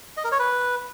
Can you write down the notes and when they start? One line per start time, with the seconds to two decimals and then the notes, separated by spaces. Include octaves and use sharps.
0.17 D#5
0.24 A#4
0.32 C#5
0.39 B4